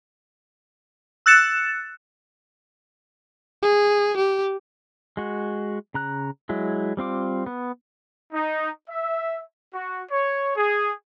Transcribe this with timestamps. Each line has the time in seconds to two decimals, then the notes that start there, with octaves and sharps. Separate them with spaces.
1.26 E6 F#6 A6 C#7 E7
3.63 G#4
4.17 G4
5.17 G#3 F#4
5.94 C#3 A#5 F#6
6.49 F#3 G#3 E4
6.97 G3 C4 F4 D6
7.46 B3
8.33 D#4
8.89 E5
9.73 F#4
10.10 C#5
10.55 G#4